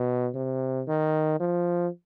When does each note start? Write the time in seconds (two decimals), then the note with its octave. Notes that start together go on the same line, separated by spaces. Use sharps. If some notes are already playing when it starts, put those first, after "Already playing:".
Already playing: B2
0.35 C3
0.88 D#3
1.40 F3